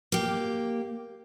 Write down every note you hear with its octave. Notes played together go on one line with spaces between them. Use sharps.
A#3 G4